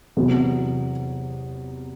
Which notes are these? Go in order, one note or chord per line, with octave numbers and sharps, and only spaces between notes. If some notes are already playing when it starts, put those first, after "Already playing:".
E2 C3 F#3 B3